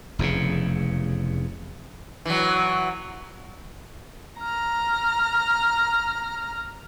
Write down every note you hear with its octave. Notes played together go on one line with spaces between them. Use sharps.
F1 E2 G#2 C#3
E3 F#3
A#5 F6